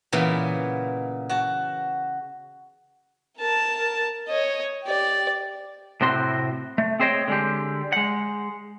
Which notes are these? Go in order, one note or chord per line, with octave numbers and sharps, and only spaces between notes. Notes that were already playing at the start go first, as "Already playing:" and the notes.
A#2 C#3 E3 A#3 B3
F#4 A5
A#4 A5
C#5 D#5
G4 D5
A2 C3 C4 F#4 C6
A3
C4 G#4 C5 C#5 D#5 G5
D3 G#3 G4
G#3 F#5